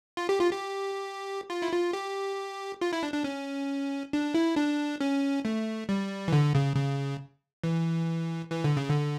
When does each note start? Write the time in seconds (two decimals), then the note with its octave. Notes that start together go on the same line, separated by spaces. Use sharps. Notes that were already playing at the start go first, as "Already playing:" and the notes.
0.17 F4
0.29 G4
0.39 F4
0.51 G4
1.50 F4
1.62 E4
1.72 F4
1.93 G4
2.81 F4
2.93 E4
3.03 D4
3.13 D4
3.24 C#4
4.13 D4
4.34 E4
4.56 D4
5.01 C#4
5.45 A3
5.89 G3
6.28 E3
6.33 D3
6.55 C#3
6.76 C#3
7.64 E3
8.51 E3
8.64 D3
8.77 C#3
8.89 D3